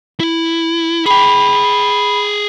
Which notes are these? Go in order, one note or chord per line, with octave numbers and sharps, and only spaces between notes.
E4
G#4 G5 B5